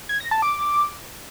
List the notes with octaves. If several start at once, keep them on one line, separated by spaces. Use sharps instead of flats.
G#6
A#6
A5
D6